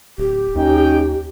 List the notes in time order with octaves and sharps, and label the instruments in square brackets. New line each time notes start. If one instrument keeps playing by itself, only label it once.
[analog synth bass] D1 [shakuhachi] G4
[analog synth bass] D#2 [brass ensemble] C#4 D#4 G5